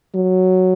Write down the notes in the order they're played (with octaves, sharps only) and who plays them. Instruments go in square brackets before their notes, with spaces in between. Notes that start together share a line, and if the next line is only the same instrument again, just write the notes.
[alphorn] F#3